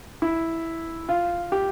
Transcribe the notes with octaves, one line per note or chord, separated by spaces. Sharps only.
E4
F4
G4